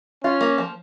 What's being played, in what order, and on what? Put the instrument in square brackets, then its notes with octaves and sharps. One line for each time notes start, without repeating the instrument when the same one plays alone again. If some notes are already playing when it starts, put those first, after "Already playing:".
[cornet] C#4 [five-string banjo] F4
[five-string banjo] A#3
F3